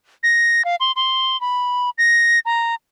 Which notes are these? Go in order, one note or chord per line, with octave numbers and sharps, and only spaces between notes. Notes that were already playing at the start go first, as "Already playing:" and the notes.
A#6
F5
C6
C6
B5
A#6
A#5